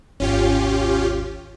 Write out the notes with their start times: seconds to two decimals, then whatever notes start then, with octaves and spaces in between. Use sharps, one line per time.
0.20 G#1 D#2 C#4 F4 G4